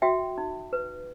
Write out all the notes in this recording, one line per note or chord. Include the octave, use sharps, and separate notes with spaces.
F#4 E5 G5
D#4
B4